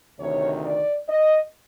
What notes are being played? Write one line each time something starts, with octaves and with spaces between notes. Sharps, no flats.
D2 C3 D#3 C#5
D5
D#5